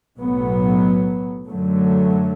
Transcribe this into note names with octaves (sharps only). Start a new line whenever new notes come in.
B1 A2 F#3 B3
F#2 D3 F#3 A3